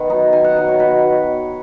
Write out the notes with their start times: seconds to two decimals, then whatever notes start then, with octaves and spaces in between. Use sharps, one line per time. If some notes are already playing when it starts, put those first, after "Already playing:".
Already playing: D#3 B3 F#5
0.09 F#3 D#4
0.33 D#3 G#5
0.44 F#5
0.56 F#3 D#4
0.68 C#5
0.80 B2 B4